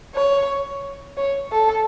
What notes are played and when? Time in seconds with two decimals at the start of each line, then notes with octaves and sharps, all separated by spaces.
0.15 C#5
1.17 C#5
1.51 A4